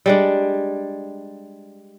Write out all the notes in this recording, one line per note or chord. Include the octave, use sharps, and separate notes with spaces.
G3 G#3 D4